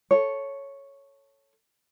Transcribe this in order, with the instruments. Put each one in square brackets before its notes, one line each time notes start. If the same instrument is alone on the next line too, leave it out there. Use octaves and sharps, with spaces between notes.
[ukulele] A4 C#5